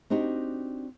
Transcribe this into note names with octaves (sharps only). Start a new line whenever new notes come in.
C4 D4 D#4 F#4 G4